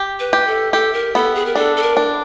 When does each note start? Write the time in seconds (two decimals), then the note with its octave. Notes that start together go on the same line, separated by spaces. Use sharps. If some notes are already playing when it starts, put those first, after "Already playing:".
Already playing: G4
0.20 B4
0.33 G4
0.47 A4
0.73 G4 A4
0.94 A#4
1.15 B3 A4
1.35 G#4
1.46 A#4
1.55 D4 A4
1.76 A4
1.82 A#4
1.97 D4